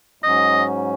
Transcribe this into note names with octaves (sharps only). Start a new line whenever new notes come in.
G#2 F#3 C#4 D#5